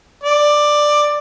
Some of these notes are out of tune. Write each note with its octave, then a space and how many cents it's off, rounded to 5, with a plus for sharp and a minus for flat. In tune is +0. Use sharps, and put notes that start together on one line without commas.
D5 +10